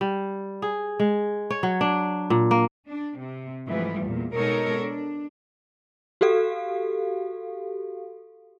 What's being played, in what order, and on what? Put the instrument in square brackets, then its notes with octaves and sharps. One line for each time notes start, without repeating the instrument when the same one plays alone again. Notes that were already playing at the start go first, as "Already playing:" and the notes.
[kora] G3
G#4
G#3
C#5
F#3
D4
A#2
A#3
[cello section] D4
C3
G#2 E3 F3 G3 A3
E2 A#2
B2 G#3 D#4 A4 A#4 C#5
D4
[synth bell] F#4 G4 A4 F5